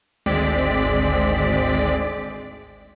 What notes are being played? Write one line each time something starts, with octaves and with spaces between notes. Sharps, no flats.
G#1 D2 G#3 C4 D5 B6